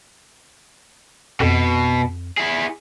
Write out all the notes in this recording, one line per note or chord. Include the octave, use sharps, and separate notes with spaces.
F2 B2
E4 G#4